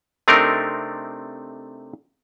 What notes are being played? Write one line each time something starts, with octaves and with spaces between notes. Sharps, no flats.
C3 A3 C4 D4 D#4 A#4